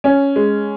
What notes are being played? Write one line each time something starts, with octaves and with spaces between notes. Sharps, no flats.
C#4
G#3